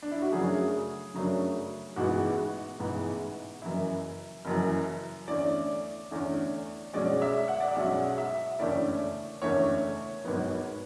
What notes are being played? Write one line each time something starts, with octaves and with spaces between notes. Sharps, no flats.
D4
E4
F#4
F#2 C#3 F#3 A3 D4 G#4
F#2 C#3 F#3 A3 D4
A1 G#2 E3 G#3 B3 F#4
A1 G#2 E3 G#3 B3
F#1 F#2 E3 E4
F#1 F#2 E3
E2 D3 A3 C#4 D5
E2 D3 A3 C#4
B1 B2 G#3 C#4 D5
E5
F#5
D5
E5
B1 B2 G#3 C#4 F#5
F#5
E5
F#1 E2 D3 A3 C#4 D5
F#1 E2 D3 A3 C#4 C#5
G#1 G#2 F#3 B3